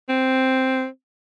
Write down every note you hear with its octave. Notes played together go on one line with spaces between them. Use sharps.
C4